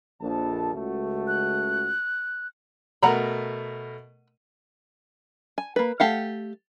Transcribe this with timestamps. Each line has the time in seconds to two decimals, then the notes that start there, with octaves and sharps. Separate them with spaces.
0.21 A#1 F2 A5
0.74 C#2 A3 F#4
1.27 F#6
3.03 B2 A3 A#4 F#5 A#5 B5
5.58 G#5
5.76 A#3 B4
6.00 A3 G4 F5 F#5